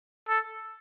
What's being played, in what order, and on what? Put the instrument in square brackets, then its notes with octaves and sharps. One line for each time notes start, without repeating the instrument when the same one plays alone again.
[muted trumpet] A4